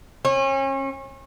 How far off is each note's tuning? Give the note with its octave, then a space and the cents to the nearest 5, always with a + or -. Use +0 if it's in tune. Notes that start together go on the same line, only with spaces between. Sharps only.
C#4 -35